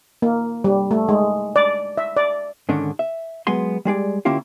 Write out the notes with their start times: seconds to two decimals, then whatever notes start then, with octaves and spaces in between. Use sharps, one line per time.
0.22 A#3
0.64 G3
0.91 A3
1.09 G#3
1.56 D5
1.98 E5
2.17 D5
2.69 G#2 D3 D#3 C#4 D4
2.99 E5
3.47 F#3 G#3 B3 G#5 C6
3.85 G3 G#3 G#4 D5
4.25 D3 A#3 C#4 E4 F4 G4